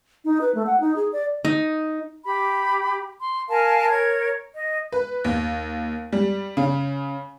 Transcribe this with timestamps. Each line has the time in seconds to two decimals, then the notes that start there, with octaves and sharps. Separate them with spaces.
0.25 D#4
0.41 B4
0.55 A3
0.67 F#5
0.80 D#4
0.96 G#4
1.13 D5
1.45 D#4
2.25 G4 B5
3.20 C6
3.49 A#4 F5 G#5 A5
3.90 A#4 C#5 G#6
4.55 D#5
4.92 B4
5.24 D#2
6.13 G3
6.57 C#3